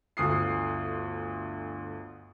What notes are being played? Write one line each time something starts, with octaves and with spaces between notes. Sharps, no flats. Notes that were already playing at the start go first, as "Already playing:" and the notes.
G1 D2 D#6 C7